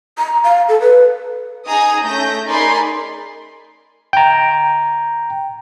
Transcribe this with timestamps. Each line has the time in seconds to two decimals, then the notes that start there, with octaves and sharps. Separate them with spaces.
0.18 A#5
0.44 F5
0.69 A4
0.81 B4
1.67 D#4 G#4 A#5 D#6
2.03 A3 C#4 G6 A#6
2.48 D#4 G#4 A#4 D5 B5 C6
4.13 G5 A#5